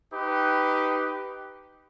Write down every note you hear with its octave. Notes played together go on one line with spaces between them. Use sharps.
D#4 G4 B4